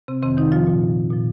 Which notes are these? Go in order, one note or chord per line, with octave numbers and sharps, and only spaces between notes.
C3 C4
F2 C3 D#3 C4
D#3 D#4
F3 F4
A#2 F3
A#2 F3